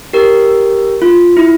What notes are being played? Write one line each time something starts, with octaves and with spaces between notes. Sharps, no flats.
G4 A#4
F4
E4